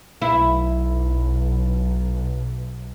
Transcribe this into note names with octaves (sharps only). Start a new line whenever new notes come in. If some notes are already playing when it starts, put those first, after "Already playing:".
B1 E4